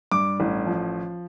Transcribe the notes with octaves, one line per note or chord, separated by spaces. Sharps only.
G2 D6
A1
F3